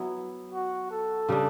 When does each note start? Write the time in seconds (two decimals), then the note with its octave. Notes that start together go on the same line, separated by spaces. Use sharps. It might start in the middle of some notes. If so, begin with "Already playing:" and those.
Already playing: F#3 B3 E4
0.52 F#4
0.91 A4
1.29 C#3 G3 D4